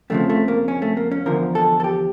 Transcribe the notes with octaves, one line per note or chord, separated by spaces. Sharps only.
F2 C#3 F3 A3
A3
A#3
C#4
A3
A#3
C#4
E2 D3 F3 A#4
A4
A4
G4